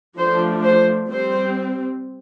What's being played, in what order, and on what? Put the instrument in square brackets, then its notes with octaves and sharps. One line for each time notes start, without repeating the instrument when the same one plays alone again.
[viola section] F3 A3 D4 C5
C5
G3 C4 C5